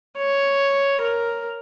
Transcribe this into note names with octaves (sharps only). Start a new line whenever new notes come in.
C#5
A#4